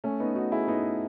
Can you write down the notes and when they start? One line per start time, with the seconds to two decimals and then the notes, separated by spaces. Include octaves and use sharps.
0.04 A3 C#4
0.20 B3 D#4
0.35 D#4 F#4
0.51 E4 G#4
0.67 B3 D#4